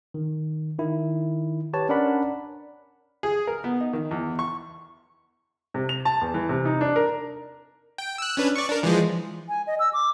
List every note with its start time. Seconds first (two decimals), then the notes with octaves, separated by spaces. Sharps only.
0.14 D#3
0.78 D#3 E4
1.73 G4 B4 C#5 A5
1.89 C#4 D4 A#4 D5 F#5 B5
3.23 G#4
3.47 A#4
3.64 B3
3.81 D#4
3.93 D#3
4.11 E2
4.39 C#6
5.74 C3
5.89 F7
6.05 A5
6.21 E2
6.34 E3
6.49 C3
6.65 D#4
6.81 D4
6.96 A#4
7.98 G5
8.18 E6 F#6
8.37 C#4 D4 B4
8.56 D5 C#6
8.68 D4 A#4
8.83 E3 F3 G#3
9.49 G#5
9.67 D#5
9.80 E6
9.93 D6